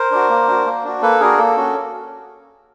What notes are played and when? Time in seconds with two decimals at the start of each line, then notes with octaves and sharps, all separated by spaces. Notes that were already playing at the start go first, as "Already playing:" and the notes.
Already playing: A#4 C5
0.11 D4 F#4
0.29 A#3
0.48 D4 F#4
0.66 A#3
0.84 D4 F#4
1.02 A#3 A4 B4
1.20 D4 F#4 G#4 A#4
1.38 A#3 A4
1.57 C#4 F#4